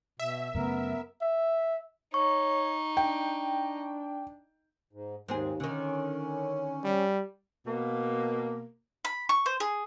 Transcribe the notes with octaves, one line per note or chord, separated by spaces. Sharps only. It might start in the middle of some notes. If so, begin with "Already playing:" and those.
B2 E5
F#2 C#3 A3 B3 A#4
E5
D#4 C#5 C#6
D4 G5
G#2
D#2 G#2 C4 G#4
D3 D#3 C#4
G3
B2 A#3
B5
C#6
C5
G#4